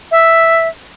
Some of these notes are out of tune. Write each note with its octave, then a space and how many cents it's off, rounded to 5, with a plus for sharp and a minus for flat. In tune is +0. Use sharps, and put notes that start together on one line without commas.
E5 +0